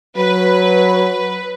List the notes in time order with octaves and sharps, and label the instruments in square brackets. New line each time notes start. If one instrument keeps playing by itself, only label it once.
[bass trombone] F#3 [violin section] B4